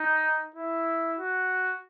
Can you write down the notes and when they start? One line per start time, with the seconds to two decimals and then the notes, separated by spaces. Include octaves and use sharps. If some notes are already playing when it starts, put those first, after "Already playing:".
Already playing: D#4
0.56 E4
1.19 F#4